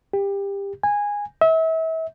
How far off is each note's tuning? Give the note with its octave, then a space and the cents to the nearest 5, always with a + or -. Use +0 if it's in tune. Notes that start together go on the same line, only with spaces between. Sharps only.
G4 +25
G#5 -15
E5 -35